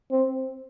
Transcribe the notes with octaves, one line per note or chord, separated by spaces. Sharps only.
C4